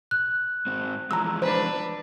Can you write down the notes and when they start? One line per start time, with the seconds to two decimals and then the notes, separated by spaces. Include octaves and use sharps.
0.11 F#6
0.66 G#2 C4
1.11 E3 F3 G#3 A#5 E6
1.42 D4 B4 C5